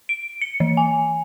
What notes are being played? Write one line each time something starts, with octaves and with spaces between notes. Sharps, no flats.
D7
C#7
E3
G#5